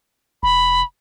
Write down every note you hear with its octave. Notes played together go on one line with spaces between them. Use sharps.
F1 B5